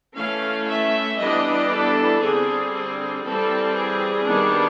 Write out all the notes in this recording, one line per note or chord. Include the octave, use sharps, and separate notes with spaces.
E3 A3 C#4 F5
E5
E3 G3 B3 D4 D#5
A4
D3 G3 C4 G#4
G#4
E3 G3 C4 A4
G#4
D#3 G3 B3 D4